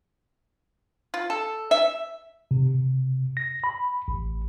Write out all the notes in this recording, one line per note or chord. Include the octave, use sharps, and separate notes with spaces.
F4
A4
E5
C3
C3
A#6
B5
A1